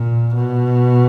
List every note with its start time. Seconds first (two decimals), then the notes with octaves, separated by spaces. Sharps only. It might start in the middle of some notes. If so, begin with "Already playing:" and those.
Already playing: A#2
0.35 B2